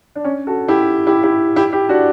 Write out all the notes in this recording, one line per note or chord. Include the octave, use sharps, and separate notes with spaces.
D4
C#4
F#4 A4
E4 G4
E4 G4
E4 G4
E4 G4
E4 G4
D4 F#4